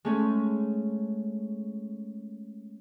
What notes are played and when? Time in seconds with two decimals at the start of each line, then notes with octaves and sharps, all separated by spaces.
0.05 G#3 A3 C#4